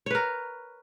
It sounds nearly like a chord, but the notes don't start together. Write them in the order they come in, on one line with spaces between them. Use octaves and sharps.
C#5 B4 A#4